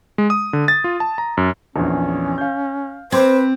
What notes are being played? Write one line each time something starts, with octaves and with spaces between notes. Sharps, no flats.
G#3
D#6
D3
A6
F4
A5
A#5
F#2
A#1 E2 C#4
F5 G6
C4 B4 C5 C6 D6 G#6